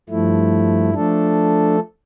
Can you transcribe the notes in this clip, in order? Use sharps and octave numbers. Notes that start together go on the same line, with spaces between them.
G2 F3 A3 E4
F3 A3 D4 A4